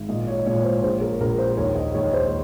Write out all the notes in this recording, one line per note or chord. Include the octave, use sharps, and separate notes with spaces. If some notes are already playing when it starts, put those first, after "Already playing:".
Already playing: G#1
A#2 D#5
C#5
A#2 C#5
C5
A#1 C5
A#4
A#1 A#4
C5
D#2 C#5
D#5
D#2 C#5
C5